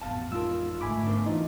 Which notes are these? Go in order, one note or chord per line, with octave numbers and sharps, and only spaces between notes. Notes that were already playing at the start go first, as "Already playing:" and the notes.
A1 F2 B2 F5 A5
G#3 D#4 F4 A#4 E6
G#2 D3 A3 G#5 B5 D6
B3 D4 A#4 C5
E3 D#4 F4